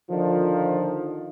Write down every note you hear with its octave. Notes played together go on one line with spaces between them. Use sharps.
D3 D#3 F3